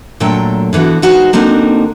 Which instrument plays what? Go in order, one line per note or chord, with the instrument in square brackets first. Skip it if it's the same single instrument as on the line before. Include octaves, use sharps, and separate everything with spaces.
[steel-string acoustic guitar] A#2 D3 F#3 A3 G5
D3 E3 B3 F#4
G#3 B3 D#4 F#4 C5
D3 A#3 C4 D#4 F#4